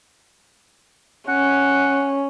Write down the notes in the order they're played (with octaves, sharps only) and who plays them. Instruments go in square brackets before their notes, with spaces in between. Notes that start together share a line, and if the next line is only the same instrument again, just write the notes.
[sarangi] C#4 [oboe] F#5